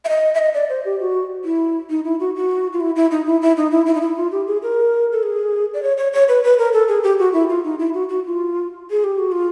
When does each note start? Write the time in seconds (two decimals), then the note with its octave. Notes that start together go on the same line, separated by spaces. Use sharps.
0.05 E5
0.09 D#5
0.34 E5
0.39 D#5
0.54 D5
0.70 C5
0.85 G4
1.00 F#4
1.45 E4
1.90 D#4
2.05 E4
2.20 F#4
2.36 F#4
2.73 F4
2.80 E4
2.96 E4
3.11 D#4
3.26 E4
3.42 E4
3.57 D#4
3.71 E4
3.86 E4
3.95 D#4
4.01 E4
4.17 F4
4.32 G4
4.47 G#4
4.63 A#4
5.12 A4
5.23 G#4
5.74 D5
5.83 C#5
5.97 C#5
6.13 C#5
6.29 B4
6.44 B4
6.58 A#4
6.73 A4
6.88 G#4
7.03 G4
7.19 F#4
7.33 E4
7.50 F4
7.64 D#4
7.79 E4
7.94 F#4
8.09 F#4
8.25 F4
8.91 G#4
9.04 G4
9.18 F#4
9.32 F4